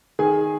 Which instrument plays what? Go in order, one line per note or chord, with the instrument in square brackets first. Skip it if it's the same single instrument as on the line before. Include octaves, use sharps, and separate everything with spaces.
[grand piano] D#3 G#4 G#5